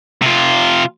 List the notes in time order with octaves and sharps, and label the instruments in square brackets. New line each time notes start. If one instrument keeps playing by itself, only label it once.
[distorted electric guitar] C3 F4